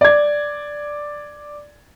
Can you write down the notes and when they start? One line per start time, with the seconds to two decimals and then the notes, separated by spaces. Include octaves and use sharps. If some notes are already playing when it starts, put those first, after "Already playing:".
0.01 D5 G#6